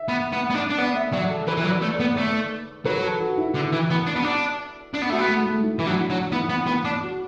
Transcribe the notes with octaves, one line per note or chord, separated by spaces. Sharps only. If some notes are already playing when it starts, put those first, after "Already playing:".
Already playing: E5
B3
B3
B3
D4
D4
B3 D5
E5
F#3 D5
A4
E3 B4
E3
F#3
D5
A3
D5
B3
A3 D5
F#3 B4
A4
F#4
E4
D3
E3
B3
D4
B3
D4
D4
B3
A3 F#4
B3
A3
A3
E4
E3
F#3 D4
F#3 D4
B3 E4
B3
B3
D4
F#4